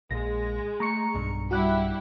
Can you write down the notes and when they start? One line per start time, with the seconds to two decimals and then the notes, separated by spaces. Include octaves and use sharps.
0.11 A#1 G#3 A#6
0.80 A3 A#5 C#6 C#7
1.14 B1 G2
1.51 G3 E4 F#4 G4 F#5 F#6